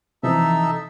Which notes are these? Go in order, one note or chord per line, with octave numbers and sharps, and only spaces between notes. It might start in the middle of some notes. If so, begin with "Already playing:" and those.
C3 E3 F3 D#4 A4 E5